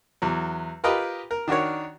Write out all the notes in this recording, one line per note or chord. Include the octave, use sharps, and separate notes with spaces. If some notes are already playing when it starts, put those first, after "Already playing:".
E2 F#3
F4 G4 A#4 B4 D#5 G5
A#4
D#3 D4 F#4 A#4 C#5